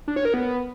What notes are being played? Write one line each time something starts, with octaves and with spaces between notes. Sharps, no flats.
D4
C#5
A#4
B3